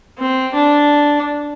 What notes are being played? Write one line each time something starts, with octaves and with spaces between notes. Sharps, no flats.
C4
D4